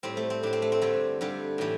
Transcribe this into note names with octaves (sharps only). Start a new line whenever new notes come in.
A2 G3 C4
A3
C4
A2 G3 D4
C4
A3
C4
G2 D3 G3
G2 D3 G3
A2 E3 G3